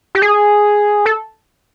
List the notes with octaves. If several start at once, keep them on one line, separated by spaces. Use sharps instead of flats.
G4
G#4
A4